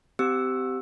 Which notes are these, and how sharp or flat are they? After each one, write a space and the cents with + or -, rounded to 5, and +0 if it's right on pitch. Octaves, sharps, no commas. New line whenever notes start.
C4 -25 G4 -15 E6 +0